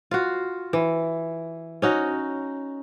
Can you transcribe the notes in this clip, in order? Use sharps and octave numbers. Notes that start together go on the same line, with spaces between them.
F4 F#4
E3
C#4 D#4 F#4